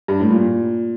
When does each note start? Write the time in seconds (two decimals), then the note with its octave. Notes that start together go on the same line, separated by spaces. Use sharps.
0.08 G2
0.20 A2
0.31 A#2